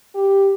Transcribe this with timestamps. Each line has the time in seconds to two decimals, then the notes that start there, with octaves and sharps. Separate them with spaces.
0.15 G4